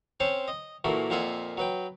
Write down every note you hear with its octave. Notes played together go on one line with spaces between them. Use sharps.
C4 C#4 C5 C#5 A5
D#5
A#2 E3 A3 A#3 F#4
F2 A#2 F4 E5 F#5 G#5
F#3 B4 G5